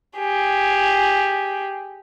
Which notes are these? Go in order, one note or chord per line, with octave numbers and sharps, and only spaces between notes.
G4 G#4